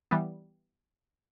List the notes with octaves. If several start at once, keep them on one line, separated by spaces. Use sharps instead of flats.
E3 G3 B3